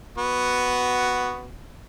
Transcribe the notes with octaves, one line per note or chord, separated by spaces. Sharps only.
B3 F#4